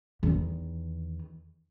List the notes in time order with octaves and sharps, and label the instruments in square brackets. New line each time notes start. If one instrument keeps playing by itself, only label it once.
[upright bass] E2 D#3